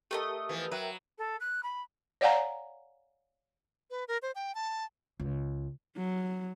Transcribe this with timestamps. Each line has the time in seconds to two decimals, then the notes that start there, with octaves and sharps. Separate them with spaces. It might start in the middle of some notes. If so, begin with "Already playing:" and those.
0.11 A3 G4 A#4 D5 D#5 A5
0.49 E3 F3 B3
0.72 F#3 A#4 B4 E5 G5
1.18 A4
1.40 F#6
1.63 B5
2.21 C#5 D5 F5 F#5 G#5 A#5
3.90 B4
4.08 A#4
4.22 C5
4.35 G5
4.55 A5
5.20 C#2
5.97 F#3